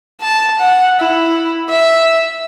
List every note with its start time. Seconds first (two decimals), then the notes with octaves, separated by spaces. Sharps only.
0.20 A5
0.59 F#5
0.99 E4
1.69 E5